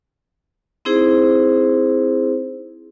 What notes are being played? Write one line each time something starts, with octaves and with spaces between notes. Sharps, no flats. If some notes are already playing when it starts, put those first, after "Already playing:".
C4 D#4 E4 G#4 C5